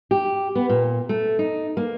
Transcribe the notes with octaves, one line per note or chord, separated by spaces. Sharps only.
G4
B3
A#2
A3
D#4
A#3